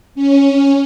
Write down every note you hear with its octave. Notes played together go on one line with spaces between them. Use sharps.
C#4